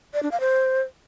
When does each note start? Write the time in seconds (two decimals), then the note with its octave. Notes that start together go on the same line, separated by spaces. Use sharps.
0.14 D5
0.23 D4
0.31 F5
0.40 C5